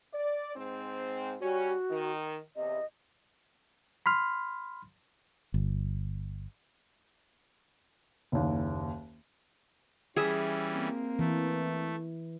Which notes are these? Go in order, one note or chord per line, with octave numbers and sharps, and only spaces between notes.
D5
G#2 C4
G3 C#4 F#4
D#3
E2 C3 D#5
B5 C6 F6
G1
F#1 D#2
E3 G3 C#4 G#4 E5
A#3 C4
E3 A3